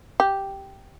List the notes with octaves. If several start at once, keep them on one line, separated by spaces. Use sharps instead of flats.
G4